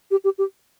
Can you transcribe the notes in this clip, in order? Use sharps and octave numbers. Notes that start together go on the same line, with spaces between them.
G4
G4
G4